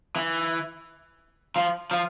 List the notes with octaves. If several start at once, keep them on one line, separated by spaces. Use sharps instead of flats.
E3
F3
F3